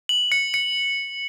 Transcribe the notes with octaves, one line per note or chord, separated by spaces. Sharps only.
F#7
C#7
C#7